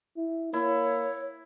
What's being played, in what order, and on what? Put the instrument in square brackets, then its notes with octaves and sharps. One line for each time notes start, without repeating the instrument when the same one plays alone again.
[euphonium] E4
[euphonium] A#3 [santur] E4 [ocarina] C#5